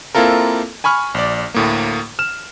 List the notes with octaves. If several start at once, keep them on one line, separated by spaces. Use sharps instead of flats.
A#3 C4 E4 F4 A4 A#4
G#5 B5 C#6 F6
A#1 D5
D2 A2 A#3
F6 E7